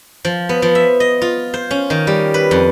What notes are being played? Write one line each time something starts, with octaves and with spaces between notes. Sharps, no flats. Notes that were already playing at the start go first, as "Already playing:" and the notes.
F3
B3
F3
E5
D#5
F4
C5
C#4
D#3
G3
B4
F2